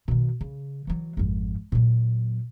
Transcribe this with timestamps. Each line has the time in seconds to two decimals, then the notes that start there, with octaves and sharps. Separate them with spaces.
0.08 B2 D#3
0.41 C#3
0.87 E3 F#3
1.17 G#1 F2
1.72 A#2 F#3